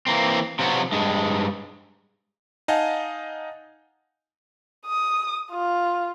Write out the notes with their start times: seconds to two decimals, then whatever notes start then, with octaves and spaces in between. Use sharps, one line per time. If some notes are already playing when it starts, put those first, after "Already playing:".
0.07 E3 A#3 C4
0.59 C3 F3 F#3 B3 F#4
0.92 G2 G#3
2.68 D#4 D#5 F5 F#5 G#5 A5
4.86 D#6
5.52 F4